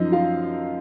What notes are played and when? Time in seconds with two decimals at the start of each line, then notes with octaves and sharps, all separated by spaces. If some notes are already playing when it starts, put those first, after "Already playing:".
Already playing: F#2 F3 D#4 D#5
0.12 F4 F5